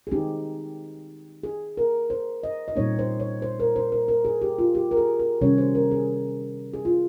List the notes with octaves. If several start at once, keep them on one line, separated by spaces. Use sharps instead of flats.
G#4
D#3 G#3 C4 D#4 G4
G#4
A#4
C5
D#5
D#5
A#2 G3 C4 D#4 C#5
C5
C#5
C5
A#4
C5
A#4
A#4
G#4
G4
F4
G4
A#4
G#4
A#4
C3 D#3 G3 C#4 C#5
C5
A#4
G#4
G#4
F4